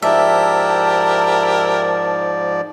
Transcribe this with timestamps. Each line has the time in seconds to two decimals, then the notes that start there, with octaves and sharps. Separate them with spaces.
0.02 G#2 F3 E4 G4 A#4 D5 E5 A5